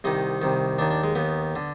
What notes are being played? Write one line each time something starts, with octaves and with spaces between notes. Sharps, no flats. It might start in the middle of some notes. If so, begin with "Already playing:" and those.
C2 C3 D#3 D#4
C2 C3 D#3
D#2 D#3 D4
D4
G#3
D#2 D#3 B3
D3